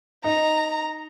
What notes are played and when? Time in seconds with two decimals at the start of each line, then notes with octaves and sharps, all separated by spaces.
0.24 D#4 A#5